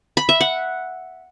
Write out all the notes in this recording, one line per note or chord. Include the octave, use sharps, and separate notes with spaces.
B5
E5
F#5